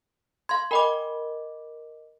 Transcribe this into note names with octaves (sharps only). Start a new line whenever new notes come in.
F5 C6 G#6
A#4 D#5 G5 G#5 B5 D6